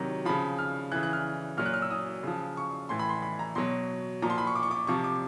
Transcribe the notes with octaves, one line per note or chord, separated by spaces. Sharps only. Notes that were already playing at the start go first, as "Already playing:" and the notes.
Already playing: C3 D#3 F#3 A#5
C#3 F3 B5
F6
C#3 E3 F#6
F#6
F6
A#2 F#3 F6
F#6
F6
E6
D#6
C#3 F3
C#6
A2 E3 C6
B5
C6
B5
A#5
B2 F#3 C6
A#2 F3 A#5
C6
B5
C#6
D6
C#6
D6
C3 F3 C#6
D6